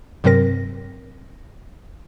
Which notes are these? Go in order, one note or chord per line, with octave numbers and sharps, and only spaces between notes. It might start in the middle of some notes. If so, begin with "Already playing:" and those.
G2 C3 F#3 C4 A#4 A#6